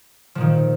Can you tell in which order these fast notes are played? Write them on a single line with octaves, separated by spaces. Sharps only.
F3 A#2 D#3